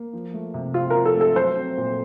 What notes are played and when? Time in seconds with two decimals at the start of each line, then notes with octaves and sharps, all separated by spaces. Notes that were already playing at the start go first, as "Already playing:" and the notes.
Already playing: A#3
0.13 F3
0.33 A3
0.54 C3
0.74 C4 F4
0.90 A#4
0.95 F3
1.05 A4
1.16 A3
1.21 A4
1.36 F#3 C5
1.56 C4
1.77 A#2